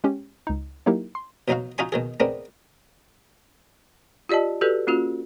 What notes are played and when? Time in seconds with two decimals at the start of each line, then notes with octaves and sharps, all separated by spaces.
0.04 G#3 C#4 G4
0.47 C#2 D#4
0.86 F#3 A#3 D#4 E4 G4 A#4
1.15 C6
1.48 B2 F#3 D#4 F#4 F5
1.78 D#4 F4 F#4 D#5 G#5 C6
1.92 B2 D#3 G#4
2.20 G#3 B3 C4 D4 A#4
4.29 F4 G4 D5 D#5 A5
4.61 F#4 G4 A4 B4 D5
4.87 A#3 C#4 F4 F#4